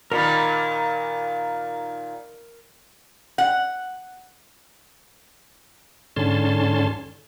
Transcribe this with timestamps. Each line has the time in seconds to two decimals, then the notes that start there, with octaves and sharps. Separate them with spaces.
0.12 A#2 D#3 A#4 A#5 B5
3.38 F#5
6.16 G#2 D3 C#4 A5 C6